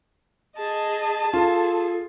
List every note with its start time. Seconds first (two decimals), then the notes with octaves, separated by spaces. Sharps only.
0.58 G#4 D#5 A5
1.33 F4 G#4 A4